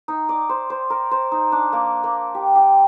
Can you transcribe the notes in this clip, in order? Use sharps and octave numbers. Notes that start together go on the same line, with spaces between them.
D#4
D5
C5
C5
A#4
C5
D#4
D4
A#3
A#3
G4
G4